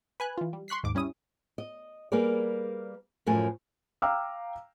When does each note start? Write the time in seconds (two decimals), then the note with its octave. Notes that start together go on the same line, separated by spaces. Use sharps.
0.20 B4 G#5 F#6
0.38 E3 F4
0.53 G3
0.68 C6 C#6 F#6 B6 C7
0.83 D#2 G#2 D6
0.95 G3 C#4 E4 D#6
1.58 D#5
2.12 G3 A#3 G#4 A#4 B4 D5
3.26 F#2 A2 F3 A3 A#4 G#5
4.02 F5 G5 A#5 D6 E6 F6